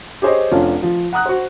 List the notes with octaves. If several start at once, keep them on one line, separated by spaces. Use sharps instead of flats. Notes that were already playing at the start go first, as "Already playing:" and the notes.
G4 G#4 C5 C#5 D#5
F1 F3 C#4 D4 F4
F3
F#5 A#5 D#6 F#6
F#4 C5